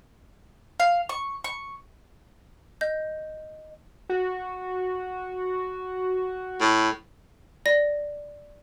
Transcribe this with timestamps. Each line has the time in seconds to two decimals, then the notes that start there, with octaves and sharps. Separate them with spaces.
0.80 F5
1.09 C#6
1.44 C#6
2.81 D#5 G6
4.09 F#4
6.60 A2
7.66 D5 A#6